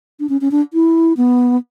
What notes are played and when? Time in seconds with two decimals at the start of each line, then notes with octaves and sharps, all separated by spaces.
0.20 D4
0.29 C#4
0.41 C#4
0.51 D4
0.73 E4
1.17 B3